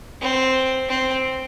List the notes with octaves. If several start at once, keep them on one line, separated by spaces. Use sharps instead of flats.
C4
C4